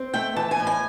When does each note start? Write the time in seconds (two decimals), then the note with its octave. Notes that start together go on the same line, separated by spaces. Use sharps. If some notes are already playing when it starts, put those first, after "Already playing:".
Already playing: C4
0.14 A3 G5
0.36 E3 A5
0.51 G#5
0.60 A2
0.67 G#5